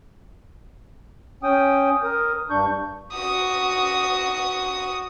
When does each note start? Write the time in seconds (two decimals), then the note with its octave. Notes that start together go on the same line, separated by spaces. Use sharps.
1.43 C#4 G5 D#6
2.03 A#4 D#6
2.50 G2 D4 C#6 G6
3.13 F#4 D#6